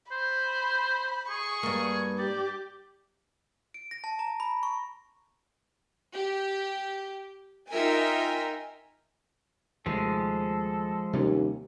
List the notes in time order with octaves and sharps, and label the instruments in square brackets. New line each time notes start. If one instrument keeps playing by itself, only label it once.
[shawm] C5 [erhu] B5
[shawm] G#4 [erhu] C#6
[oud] G2 A#3
[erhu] G4 [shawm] D5
[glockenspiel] D7
A#6
A5
A#5
B5
C#6
[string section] G4
D#4 F4 A#4 E5 G5 G#5
[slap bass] D#2 C3 A3 [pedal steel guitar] F3 G#3 [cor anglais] A4
[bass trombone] D#2 [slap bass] C3 G3 C#4